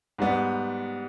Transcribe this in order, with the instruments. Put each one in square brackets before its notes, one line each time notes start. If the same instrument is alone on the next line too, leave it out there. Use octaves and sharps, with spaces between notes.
[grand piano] G#2 G3 B3